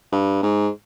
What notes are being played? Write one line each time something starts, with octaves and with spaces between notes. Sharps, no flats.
G2
G#2